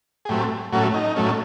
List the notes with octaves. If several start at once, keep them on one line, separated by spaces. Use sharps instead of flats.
G#4
A2 F#3 A3 C4 G4
A2 F#3 A3 C#4 F#4
D#4
A2 F#3 A3 C#4